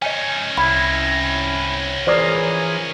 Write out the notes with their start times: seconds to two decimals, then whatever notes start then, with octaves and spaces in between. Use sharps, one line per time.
0.02 C#4 D#4 D#5 G#5
0.57 C2 E4 B5
2.07 E3 F4 G#4 A#4 C5 D5 D6